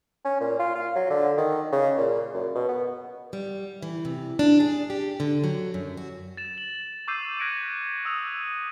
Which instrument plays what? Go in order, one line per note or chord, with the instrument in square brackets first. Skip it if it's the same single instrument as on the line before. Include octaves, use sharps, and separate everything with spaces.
[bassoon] C#4
A#2
F4
F4
F#3
D3
D#3
C#3
A#2
F#2
B2
B3
[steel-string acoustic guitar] G3
E3
C3
D4
G#4
G4
D3
F#3
F#2
F#4
[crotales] A6 E7
F#7
C#6 D6 E6 G6 C7 D#7
F#6 G#6 A#6 B6 C#7 D7
D#6 E6 D#7 F7
F#6